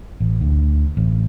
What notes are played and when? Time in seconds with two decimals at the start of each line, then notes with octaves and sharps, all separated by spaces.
0.20 A1
0.41 D2
0.97 A1